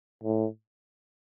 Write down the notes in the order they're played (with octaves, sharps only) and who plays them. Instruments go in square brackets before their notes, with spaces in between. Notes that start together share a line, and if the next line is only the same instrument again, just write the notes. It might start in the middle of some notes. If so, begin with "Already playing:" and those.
[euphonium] A2